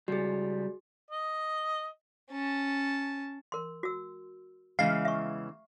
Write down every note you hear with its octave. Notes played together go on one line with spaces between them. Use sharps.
C#2 G3 F#4 G#4
D#5
C#4 A5
A#4 C6
F#4 E6
E2 C#3 E3 G#3 F5
E5 C#6